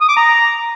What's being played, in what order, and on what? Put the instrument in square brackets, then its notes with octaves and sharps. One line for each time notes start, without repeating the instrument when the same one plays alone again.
[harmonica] D#6
D6
A#5